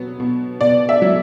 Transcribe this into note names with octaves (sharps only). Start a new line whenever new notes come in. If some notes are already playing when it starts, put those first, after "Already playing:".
Already playing: B2 F#3 B3
B2
B2 D5
E5
F#3